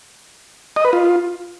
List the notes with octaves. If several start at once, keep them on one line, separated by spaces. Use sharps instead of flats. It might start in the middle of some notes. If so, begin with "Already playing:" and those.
D#5
B4
F4